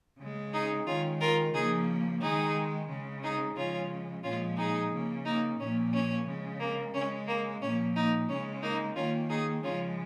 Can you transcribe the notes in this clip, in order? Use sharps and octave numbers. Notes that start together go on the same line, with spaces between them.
C#3 G#3
D#4 G#4
D#3 G#3 C#4 F4
F4 A#4
C#3 F3 A#3 D#4 G#4
D#3 G#3 D#4 G#4
C#3 G#3
D#4 G#4
C#3 F3 G#3 C#4 F4
A#2 F3 G#3 C#4 F4
D#4 G#4
C#3 A#3
A#3 D#4
A#2 F3 A#3 C#4
C#4
C#3 G#3
A#3
C#3 G#3 C#4
A#3
A#2 F3 A#3 C#4
A#3 D#4
C#3 G#3 C#4
A#3 D#4
D#3 A#3 C#4 F4
D#4 G#4
C#3 F3 G#3 C#4 F4